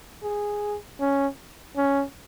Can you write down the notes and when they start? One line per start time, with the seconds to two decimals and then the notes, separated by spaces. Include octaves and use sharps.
0.23 G#4
1.00 C#4
1.76 C#4